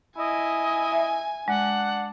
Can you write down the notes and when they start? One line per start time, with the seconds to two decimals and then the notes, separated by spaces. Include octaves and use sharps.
0.18 E4 D#5 G#5
0.92 E5
1.48 G#3 D4 F#5